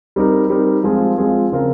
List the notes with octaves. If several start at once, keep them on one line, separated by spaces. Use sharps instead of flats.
G3 C4 D#4 A#4
G3 C4 D#4 A#4
F3 G#3 C4 F4 G#4
F3 G#3 C4 F4 G#4
C#3 F3 C4 F4 A#4